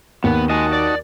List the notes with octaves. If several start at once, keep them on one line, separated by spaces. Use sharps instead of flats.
D#2 B3
D#4 F#4 D#5 G#5 A5
D5